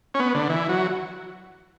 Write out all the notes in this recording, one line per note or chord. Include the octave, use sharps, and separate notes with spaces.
C#4
B3
D3
E3
F#3